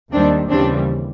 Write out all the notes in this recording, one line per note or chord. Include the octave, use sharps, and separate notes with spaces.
D#2 D#3 G3 C4 D4
D#2 C#3 E3 G3 C4 D4